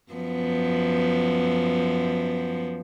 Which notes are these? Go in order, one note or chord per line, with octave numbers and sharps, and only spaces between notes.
F#2 F3 B3